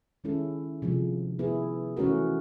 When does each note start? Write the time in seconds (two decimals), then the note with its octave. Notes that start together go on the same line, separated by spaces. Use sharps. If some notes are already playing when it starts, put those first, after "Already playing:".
0.24 D#3 G#3 C#4 E4 A4
0.82 C3 F3 G#3
1.39 B3 E4 G#4
1.97 E3 A3 C#4 F#4 A#4